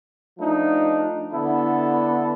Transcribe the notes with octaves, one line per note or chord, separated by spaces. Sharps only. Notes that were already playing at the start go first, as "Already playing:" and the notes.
F3 A3 D4 D#4
D3 B3 E4 A4